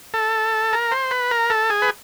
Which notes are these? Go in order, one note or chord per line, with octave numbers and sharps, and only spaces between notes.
A4
A#4
C5
B4
A#4
A4
G#4
B4